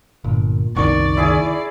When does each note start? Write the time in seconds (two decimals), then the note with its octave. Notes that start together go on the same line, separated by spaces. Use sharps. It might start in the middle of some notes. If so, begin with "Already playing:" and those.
0.24 G1 A#2
0.76 F#1 C2 B2 D#3 D5 C#6
1.17 D#2 E4 G#4 G#5